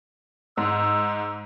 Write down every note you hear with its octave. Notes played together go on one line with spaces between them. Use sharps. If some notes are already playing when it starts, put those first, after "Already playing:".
G#2 E6